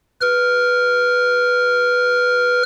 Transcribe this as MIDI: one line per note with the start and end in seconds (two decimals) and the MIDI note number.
0.21 2.63 71
0.21 2.63 89